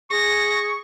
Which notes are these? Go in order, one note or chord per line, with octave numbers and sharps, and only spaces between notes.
G#4 C#6 A#6